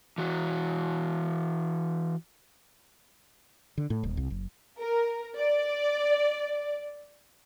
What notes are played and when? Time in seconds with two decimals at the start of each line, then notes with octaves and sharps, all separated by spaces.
0.18 E3 F#4
3.78 D3
3.90 A2
4.03 D#1
4.17 C2
4.30 F#1
4.79 A#4
5.38 D5